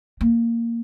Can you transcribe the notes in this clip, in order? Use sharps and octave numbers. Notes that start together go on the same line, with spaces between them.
A#3